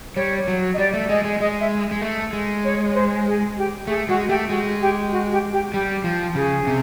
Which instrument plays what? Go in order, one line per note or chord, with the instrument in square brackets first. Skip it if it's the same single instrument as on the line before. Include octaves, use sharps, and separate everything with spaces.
[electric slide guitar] G3 [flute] C#5
[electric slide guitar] F#3
[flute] D#5
[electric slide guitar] G3 [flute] D5
[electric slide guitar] A3
[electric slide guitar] G#3 [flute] D#5
[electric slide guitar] G#3
[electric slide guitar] G#3 [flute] D#5
[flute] E5
[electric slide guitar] G#3
A3
G#3
[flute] C#5
C5
G#4
G4
[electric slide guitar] A3 [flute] G#4
[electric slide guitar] G#3 [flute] F#4
[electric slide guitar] A3 [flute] G4
[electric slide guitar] G#3 [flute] F#4
[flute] G4
F#4
G4
G4
[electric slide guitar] G3 [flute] G4
[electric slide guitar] F3
[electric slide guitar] C#3 [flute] G#4
[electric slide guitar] C3